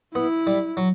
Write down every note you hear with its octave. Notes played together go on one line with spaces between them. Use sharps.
B3 E4
G3
F#3